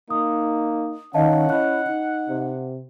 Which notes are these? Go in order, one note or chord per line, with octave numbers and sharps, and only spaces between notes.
A#3 D#4 D#6
D#3 C#4 D#5 F5 F#5 A5
E4 D#5 F#6
D#4
C3